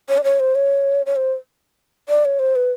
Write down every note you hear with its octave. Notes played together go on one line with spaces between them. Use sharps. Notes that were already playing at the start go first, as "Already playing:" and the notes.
C#5
D5
C#5
C5
C#5
C#5
C5
D5
C#5
C5
B4